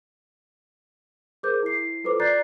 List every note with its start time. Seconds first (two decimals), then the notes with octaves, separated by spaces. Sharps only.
1.43 G#4 A#4 C5 D6 G6
1.63 E4 C7
2.04 F4 A4 B4 C5 D6
2.20 D5 A#5 F#6 G6 A6 C7